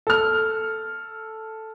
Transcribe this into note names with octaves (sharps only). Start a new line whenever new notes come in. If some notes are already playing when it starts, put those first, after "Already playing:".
A4 F6